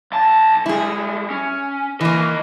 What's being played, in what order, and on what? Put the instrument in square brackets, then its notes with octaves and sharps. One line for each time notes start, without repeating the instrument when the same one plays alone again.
[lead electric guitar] B1 A5
[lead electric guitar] G3 G#3 [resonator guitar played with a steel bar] E4 G#4
[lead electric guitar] C#4
[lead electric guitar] C2 D#5 [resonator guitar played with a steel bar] E3 A#3